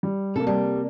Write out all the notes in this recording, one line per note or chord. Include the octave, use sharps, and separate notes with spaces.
G3
C3 A#3 A4
G3